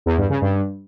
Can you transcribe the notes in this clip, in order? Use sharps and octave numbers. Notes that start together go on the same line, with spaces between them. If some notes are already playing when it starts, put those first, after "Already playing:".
E2
G2
C#3
G2